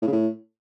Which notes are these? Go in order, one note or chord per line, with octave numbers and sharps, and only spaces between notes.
A2
C#3
A2